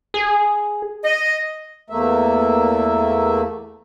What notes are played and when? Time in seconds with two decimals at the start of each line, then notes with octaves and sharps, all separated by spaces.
0.14 G#4
1.03 D#5
1.90 E2 A3 A#3 E5